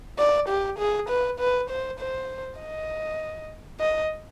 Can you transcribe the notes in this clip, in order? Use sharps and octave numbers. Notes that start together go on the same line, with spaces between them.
D5
G4
G#4
B4
B4
C5
C5
D#5
D#5